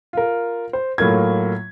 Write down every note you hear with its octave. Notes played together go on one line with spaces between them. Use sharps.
F4 A#4
C5
A2 F#3 A#3 F4 G#6